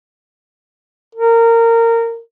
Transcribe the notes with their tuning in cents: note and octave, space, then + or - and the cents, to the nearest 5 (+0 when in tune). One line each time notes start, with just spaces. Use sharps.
A#4 -20